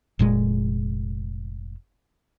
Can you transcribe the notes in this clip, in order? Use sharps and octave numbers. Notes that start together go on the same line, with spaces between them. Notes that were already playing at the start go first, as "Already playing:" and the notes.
F1 A#2 G#3